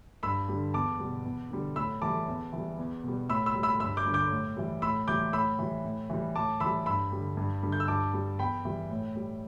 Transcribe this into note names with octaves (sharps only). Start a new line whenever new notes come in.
G2 B5 E6
D3 G3
E2 A5 D6
B2 G3
E2
D3 G3
A2 B5 E6
E3 G3 A5 D6
E2
E3 G3
E2
B2 G3
A2 B5 E6
B5 E6
G3
B5 E6
G2 B5 E6
D6 G6
D3 G3
D6 G6
A2
E3 G3
A2 B5 E6
E3 G3 D6 G6
A2 B5 E6
E3 G3
A2
E3 G3
A2 A5 D6
E3 G3 B5 E6
G2 B5 E6
D3 G3
G2
D3 G3
G6
E6
G2 A5 D6
G3
E2 G5 B5
E3 G3
A2
G3